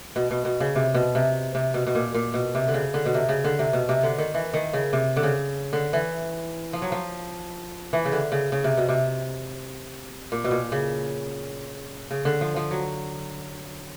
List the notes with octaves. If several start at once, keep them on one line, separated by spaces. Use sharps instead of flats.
B2
B2
B2
C#3
C3
B2
C3
C3
B2
B2
A#2
A#2
B2
C3
D3
C#3
D3
B2
C3
C#3
D3
C3
B2
C3
D3
D#3
E3
D#3
C#3
C3
D3
C#3
D3
E3
F3
F#3
F3
E3
C#3
D3
C#3
C#3
C3
B2
C3
A#2
B2
A#2
C#3
C#3
D3
F3
F3
F#3